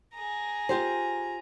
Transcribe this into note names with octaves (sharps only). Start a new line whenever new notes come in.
G#4 A#5
F4 G4 C5